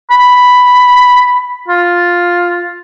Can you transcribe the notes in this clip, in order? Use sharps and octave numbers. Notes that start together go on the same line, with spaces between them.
B5
F4